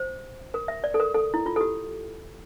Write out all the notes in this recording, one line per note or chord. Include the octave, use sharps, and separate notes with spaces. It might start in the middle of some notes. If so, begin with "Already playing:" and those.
Already playing: C5
A#4
E5
D5
A4
A#4
A4
E4
F4
A4
G4